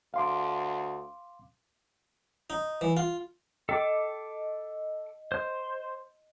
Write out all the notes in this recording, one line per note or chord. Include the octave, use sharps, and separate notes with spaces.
D2 F5 C6 D6
D#4
E3
F4
A4 D#5 D6
C5